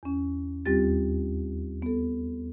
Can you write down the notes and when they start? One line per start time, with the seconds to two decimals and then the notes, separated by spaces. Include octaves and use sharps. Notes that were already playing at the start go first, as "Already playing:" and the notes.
0.03 E2 C#4
0.65 D#2 G3 C4 F4 G4 A6
1.82 B3 A4